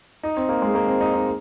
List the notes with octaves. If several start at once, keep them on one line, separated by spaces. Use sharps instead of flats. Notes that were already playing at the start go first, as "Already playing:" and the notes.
D#4
C4
A#3
G#3
A#3
C4
D#4
D#4